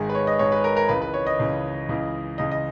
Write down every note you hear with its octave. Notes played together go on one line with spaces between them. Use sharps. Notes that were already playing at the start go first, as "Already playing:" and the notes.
Already playing: G#1 G#2 D#3 G#4
B4
C#5
D#5
G#1 G#2 D#3 C#5
B4
A#4
A#4
C#2 C#3 E3 B4
B4
C#5
D#5
C#2 C#3 E3
C#2 C#3 E3
C#2 C#3 E3 D#5
D#5